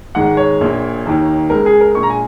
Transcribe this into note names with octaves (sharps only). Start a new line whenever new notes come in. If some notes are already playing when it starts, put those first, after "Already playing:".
G#1 G#2 D#3 G#3 F#5
C#5
A#1 A#2 A#3
D#2 D#3 A#3
C#2 C#3 G#3 A#4
G#4
A#4
A#1 A#2 G#3 C#6
A#5
G#5